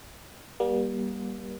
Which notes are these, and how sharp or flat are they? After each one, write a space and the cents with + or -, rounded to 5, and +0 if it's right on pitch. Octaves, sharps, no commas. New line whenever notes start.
G3 +0 A#3 +40